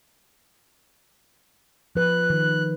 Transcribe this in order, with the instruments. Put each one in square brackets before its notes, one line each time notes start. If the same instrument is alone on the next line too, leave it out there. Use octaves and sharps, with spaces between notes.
[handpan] F3 B4 [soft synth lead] F#6
[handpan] D#3